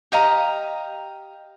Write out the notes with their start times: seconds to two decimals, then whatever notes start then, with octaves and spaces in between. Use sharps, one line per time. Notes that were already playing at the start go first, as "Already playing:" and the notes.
0.12 G4 D#5 F5 A#5